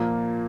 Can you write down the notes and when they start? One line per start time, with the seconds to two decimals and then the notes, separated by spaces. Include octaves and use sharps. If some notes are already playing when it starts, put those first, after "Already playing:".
Already playing: A#2 F3 A#3